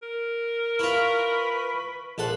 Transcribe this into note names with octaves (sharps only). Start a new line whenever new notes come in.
A#4
E4 F4 B4 B5 C#6
A#1 A4 C5 F#5